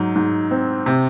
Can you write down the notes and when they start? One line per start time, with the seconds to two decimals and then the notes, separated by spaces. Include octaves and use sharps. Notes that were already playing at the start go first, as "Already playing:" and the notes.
Already playing: G#2 F#3
0.16 G#2
0.51 C4
0.86 C3